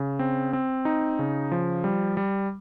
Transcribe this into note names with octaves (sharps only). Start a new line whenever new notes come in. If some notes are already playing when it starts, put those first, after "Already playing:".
Already playing: C#3
C4
C4
D#4
C#3
F3
G3
G3